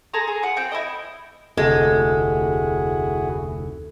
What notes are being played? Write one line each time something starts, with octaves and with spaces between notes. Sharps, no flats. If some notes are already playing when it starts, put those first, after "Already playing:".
G#4 A4 A#5 C6
G#4
F4 F#5
C4 G5
E4 A4 D#5
F1 D2 C3 G#3 E4 F#4 G#4 A4